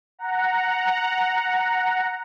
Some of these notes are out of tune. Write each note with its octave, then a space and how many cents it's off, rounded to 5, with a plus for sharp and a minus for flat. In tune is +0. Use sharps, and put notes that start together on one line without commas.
F#5 +0 A#5 +0